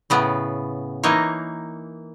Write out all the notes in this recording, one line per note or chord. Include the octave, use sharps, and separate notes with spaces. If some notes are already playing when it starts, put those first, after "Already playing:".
A2 C#3 B3
E3 A#3 D#4 C#5